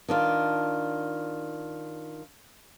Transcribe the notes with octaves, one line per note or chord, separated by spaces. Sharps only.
D#3 D4 F4